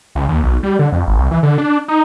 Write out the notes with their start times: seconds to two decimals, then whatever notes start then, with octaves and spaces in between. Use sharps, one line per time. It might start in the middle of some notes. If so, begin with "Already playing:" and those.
0.15 C#2
0.28 D#2
0.43 B1
0.63 G3
0.79 D3
0.92 F2
1.07 G#1
1.18 C2
1.31 E3
1.43 D3
1.58 D4
1.88 D#4